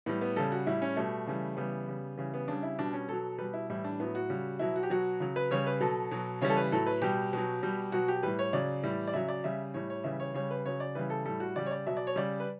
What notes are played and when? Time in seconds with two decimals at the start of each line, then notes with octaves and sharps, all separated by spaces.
0.06 A2 G3 B3
0.21 B3
0.36 C#3 G3 A4
0.52 F#4
0.67 A2 G3 E4
0.82 C#4
0.96 B2 G3 A3
1.27 C#3 E3 G3
1.57 C#3 E3 G3 B3
1.87 C#3 G3
2.17 C#3 E3 G3
2.34 B3
2.48 C#3 G3 D4
2.63 E4
2.79 B2 G3 D4
2.93 C#4
3.09 B2 F#3 A4
3.38 B2 G3 B4
3.54 E4
3.70 A2 E3 G3 E4
3.84 D4
4.00 A2 F#3 B3
4.15 F#4
4.30 C#3 G3
4.59 B2 F#3 E4
4.76 F#4
4.83 G4
4.90 B2 F#3 F#4
5.20 C#3 F#3
5.36 B4
5.51 C#3 G3 C#5
5.66 B4
5.81 B2 F#3 A4
6.11 B2 F#3
6.42 C#3 E3 G3 C#5
6.50 A4
6.57 B4
6.72 A2 F#3 A4
6.86 B4
7.01 B2 G3 G4
7.33 B2 F#3
7.63 B2 G3
7.92 B2 F#3 F#4
8.08 G4
8.23 A2 G3 B4
8.39 C#5
8.53 C#3 F#3 D5
8.83 A2 E3 G3
9.08 D5
9.14 C#3 F#3 E5
9.29 D5
9.44 C#3 G3 E5
9.74 A2 G3 C#5
9.90 C#5
10.04 C#3 E3 G3 E5
10.20 C#5
10.34 C#3 G3 C#5
10.51 B4
10.65 C#3 F#3 C#5
10.80 D5
10.95 C#3 E3 G3 B4
11.10 A4
11.25 A2 G3 A4
11.40 F#4
11.56 C#3 G3 D5
11.66 C#5
11.71 D5
11.87 B2 F#3 E5
11.97 D5
12.07 C#5
12.16 C#3 G3 D5
12.40 B4